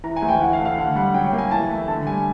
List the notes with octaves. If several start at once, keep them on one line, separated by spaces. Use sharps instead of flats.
E3 A#5
G#5
D2
G5
E3 F#5
F5
A3
F5
D3 F#5
G3 F#5
F#3 G5
G5
A#3
G#5
E3 A5
A3
D3 A5
G3 G#5